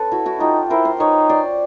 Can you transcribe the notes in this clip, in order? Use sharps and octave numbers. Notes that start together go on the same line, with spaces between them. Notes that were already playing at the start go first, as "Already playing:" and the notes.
Already playing: A4 B4 C#5
E4 F#4
E4 F#4
D#4 F4 G4
E4 A#4 C5
A#4 C5
D#4 B4 C#5
C5 D5